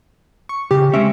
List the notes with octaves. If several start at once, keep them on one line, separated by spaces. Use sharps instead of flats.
C#6
C#3 G4
G#3 C4 C#4 E5